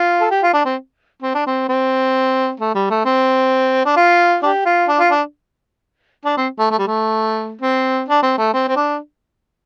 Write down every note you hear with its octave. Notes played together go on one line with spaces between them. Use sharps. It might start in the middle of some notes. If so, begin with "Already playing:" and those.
Already playing: F4
A4
G4
F4
D4
C4
C4
D4
C4
C4
A3
G3
A3
C4
D4
F4
D4 G4
F4
D4
F4
D4
D4
C4
A3
A3
G3
A3
C4
D4
C4
A3
C4
C4
D4